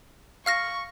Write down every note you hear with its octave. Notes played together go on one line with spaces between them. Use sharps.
F5 C#6 F6 A#6